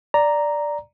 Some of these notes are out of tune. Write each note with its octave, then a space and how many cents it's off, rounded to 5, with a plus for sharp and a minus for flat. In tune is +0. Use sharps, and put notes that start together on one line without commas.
D5 +0 A#5 +0